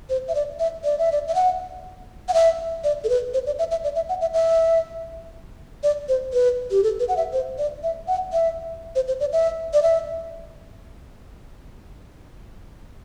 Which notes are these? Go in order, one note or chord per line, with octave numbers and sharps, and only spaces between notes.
C5
E5
D5
E5
D5
E5
D5
E5
F#5
F#5
E5
D5
A4
B4
C5
D5
E5
E5
D5
E5
F#5
E5
E5
D5
C5
B4
G4
A4
B4
F#5
E5
C5
D5
E5
F#5
E5
C5
C5
D5
E5
D5
E5